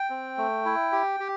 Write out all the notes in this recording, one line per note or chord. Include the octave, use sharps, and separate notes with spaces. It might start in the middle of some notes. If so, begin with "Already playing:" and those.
Already playing: G5
C4
A3
E4
G4
G4